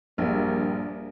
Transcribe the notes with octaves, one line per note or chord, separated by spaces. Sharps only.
A#1 G2 G3 A#3